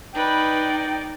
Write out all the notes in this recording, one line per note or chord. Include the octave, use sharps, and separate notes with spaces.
D#4 B4 D5 G5